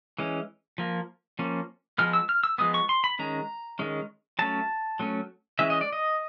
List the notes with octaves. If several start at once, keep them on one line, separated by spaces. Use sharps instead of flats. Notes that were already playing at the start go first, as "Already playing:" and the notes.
E3 G#3 C#4
F3 A#3
F3 A#3 C#4
F3 G#3 B3 F6
E6
F6
E6
F3 G#3 B3 D#6
C#6
C6
B5
D#3 G#3 C#4 A#5
D#3 G#3 C#4
F#3 A3 C#4 A5
F#3 A3 C#4
E3 G#3 C#4 E5
D#5
D5
D#5